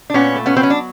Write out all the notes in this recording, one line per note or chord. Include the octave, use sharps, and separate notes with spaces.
D4
A#2 B3 C#4
A3
B3 C#4
F#3 C4
C#4
D4